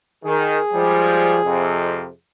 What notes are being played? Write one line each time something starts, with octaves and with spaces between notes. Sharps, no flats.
D#3 G#4
F3 G3 G#3
F2 C3